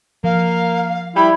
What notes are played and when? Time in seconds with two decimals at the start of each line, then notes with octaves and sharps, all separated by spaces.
0.24 F3 A#3 F5
1.16 G3 E4 B5